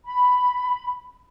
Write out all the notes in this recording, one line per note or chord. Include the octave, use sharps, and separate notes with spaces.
B5